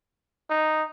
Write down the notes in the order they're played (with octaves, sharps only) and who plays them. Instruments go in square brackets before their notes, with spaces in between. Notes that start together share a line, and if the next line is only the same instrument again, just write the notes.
[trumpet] D#4